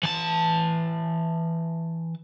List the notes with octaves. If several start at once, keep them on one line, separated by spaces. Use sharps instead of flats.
E3 A5